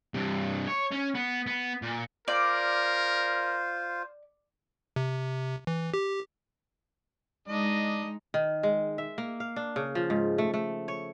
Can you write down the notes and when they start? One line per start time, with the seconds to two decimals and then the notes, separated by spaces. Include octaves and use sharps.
0.14 G2 C3
0.67 C#5
0.91 C#4
1.15 B3
1.47 B3
1.82 A#2
2.28 F4 A#4 C5 D5
4.96 C3
5.67 E3
5.94 G4
7.48 G#3 D4 D#4 D#5
8.34 D#3
8.63 G#3
8.98 E5
9.18 A#3
9.40 F5
9.56 D4
9.76 C#3
9.95 F3
10.10 G#2
10.38 A3
10.54 A3
10.88 C#5